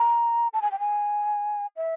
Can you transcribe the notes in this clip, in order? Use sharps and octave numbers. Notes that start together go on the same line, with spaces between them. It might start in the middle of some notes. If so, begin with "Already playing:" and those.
Already playing: A#5
A5
G#5
G5
G#5
E5